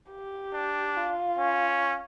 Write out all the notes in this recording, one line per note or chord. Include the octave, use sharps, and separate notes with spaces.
G4
D4
F4
C#4